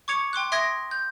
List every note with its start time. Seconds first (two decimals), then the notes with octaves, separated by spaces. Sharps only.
0.08 C#6 D6 G#6 C#7 F7
0.33 G5 C6 D6 F#6
0.52 E5 C6 D#6 G#6 A#6 D7
0.91 G6